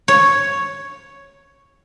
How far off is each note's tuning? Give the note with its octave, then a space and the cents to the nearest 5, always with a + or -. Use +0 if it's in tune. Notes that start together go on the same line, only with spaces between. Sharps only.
C#5 +0